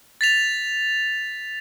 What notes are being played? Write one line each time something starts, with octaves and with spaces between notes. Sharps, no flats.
A6 B6 F7